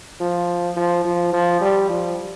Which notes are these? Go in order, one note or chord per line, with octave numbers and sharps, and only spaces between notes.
F3
F3
F3
F3
G3
F3